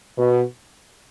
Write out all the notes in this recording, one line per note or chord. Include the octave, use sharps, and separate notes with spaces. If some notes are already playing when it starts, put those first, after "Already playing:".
B2